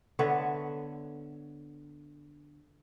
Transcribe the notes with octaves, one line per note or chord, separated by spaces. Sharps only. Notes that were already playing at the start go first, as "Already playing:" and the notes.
D3 B3 C#5 E5